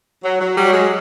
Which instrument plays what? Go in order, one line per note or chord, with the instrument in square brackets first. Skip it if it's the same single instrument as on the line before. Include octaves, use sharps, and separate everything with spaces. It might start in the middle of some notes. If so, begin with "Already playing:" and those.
[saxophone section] F#3
F#3
F#3 G3
G#3